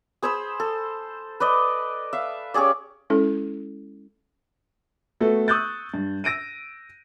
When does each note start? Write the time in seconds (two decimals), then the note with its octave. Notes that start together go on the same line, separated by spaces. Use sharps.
0.22 G#4 C5 B5 E6
0.60 A4
1.40 B4 D5 D#5
2.13 E5 F5
2.54 C#4 G4 G#4 D5
3.10 G#3 C#4 E4 A4
5.20 A3 B3 F#4 A4
5.48 C#6 D#6 E6 F#6 G6 A6
5.94 G2
6.24 E6 A#6 D7 D#7